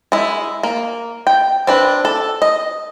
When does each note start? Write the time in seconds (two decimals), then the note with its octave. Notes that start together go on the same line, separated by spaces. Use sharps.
0.12 G#3 E4
0.63 A#3
1.27 G5
1.67 C4 D4 B4
2.05 A4
2.42 D#5